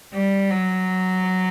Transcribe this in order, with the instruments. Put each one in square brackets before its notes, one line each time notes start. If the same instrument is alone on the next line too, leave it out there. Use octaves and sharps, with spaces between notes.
[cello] G3
F#3